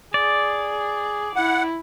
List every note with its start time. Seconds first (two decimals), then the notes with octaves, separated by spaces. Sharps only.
0.14 G#4 D5
1.36 E4 F#5